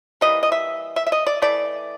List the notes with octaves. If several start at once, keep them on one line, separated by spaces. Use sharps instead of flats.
E3 G3 A#3 D#5
D#5
E5
E5
E5
D#5
D5
E3 A3 D5